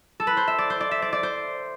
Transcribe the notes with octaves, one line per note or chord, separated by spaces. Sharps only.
A4
B4
C5
E5
D5
C5
D5
E5
D5
D5
C5